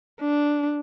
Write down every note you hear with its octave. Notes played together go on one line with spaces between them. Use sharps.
D4